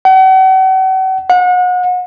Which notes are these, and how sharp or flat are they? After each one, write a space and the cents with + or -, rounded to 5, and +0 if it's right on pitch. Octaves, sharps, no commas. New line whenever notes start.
F#5 +40
F#5 -35